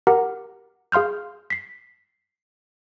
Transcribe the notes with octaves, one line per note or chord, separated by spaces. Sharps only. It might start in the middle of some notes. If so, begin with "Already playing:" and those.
G4 A#4 F#5 A#5
G#4 F5 C6 F6 G6
B6 C7